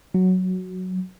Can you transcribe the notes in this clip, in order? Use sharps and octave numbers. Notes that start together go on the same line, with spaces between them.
F#3